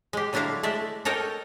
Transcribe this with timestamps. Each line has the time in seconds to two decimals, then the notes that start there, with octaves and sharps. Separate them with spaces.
0.13 G#3 G4
0.33 D3 F#3 D4 E4 F5 A#5
0.63 G#3 A3 D5 E5
1.05 A4 A#4 C#5 D#5 G5